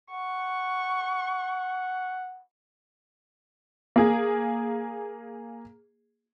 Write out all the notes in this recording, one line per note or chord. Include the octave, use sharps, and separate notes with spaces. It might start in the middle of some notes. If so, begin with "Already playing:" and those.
F#5 C#6
A#3 G#4